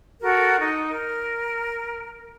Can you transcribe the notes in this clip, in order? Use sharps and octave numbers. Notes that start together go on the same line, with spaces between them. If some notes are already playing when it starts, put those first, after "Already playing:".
F#4 A4 A#4
D#4
A#4